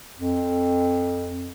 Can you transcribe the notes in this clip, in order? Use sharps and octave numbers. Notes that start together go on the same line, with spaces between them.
F2